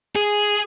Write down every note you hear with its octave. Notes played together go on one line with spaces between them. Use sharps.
G#4